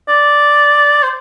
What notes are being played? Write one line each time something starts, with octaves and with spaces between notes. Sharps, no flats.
D5
C5